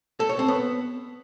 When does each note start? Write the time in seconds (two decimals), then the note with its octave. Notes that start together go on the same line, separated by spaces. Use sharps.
0.20 A4
0.29 C#5
0.39 C4
0.48 B3